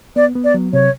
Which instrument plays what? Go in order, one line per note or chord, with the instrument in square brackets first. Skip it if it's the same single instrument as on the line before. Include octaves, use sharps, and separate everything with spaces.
[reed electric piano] B3 [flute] D5
[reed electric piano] B3
[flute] D5
[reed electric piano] F#3
[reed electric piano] C3 [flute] C#5